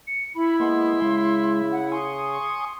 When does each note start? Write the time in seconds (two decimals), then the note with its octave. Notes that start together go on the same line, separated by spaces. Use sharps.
0.07 C#7
0.35 E4 B5
0.60 G#3 A#3 B3 C6
1.02 C#3 G#3
1.72 F#5
1.92 G#5 C6 C#6 D#6